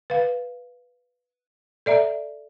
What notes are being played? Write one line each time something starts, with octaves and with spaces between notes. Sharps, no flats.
B4 F5
A4 D5 E5 A#5